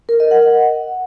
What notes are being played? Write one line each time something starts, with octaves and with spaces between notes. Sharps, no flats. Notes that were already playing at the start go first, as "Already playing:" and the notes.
A#4
D#5
F#5